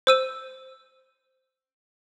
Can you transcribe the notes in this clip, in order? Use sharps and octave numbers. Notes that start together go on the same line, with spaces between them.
C5 E6 D#7